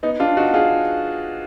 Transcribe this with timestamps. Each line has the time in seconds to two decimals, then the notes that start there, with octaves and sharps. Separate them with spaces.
0.03 B3 D#4
0.20 D4 F4
0.37 D#4 F#4
0.54 F4 G#4